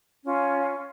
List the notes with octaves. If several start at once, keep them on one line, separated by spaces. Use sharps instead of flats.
C#4 F4